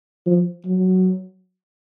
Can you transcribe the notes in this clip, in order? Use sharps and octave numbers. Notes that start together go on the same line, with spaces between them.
F3
F#3